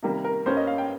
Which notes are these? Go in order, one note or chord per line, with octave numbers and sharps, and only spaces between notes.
C3 D#3 G3 A#3
A#4
G2 G3 A#3 C#4 C5
D#5
F5
G5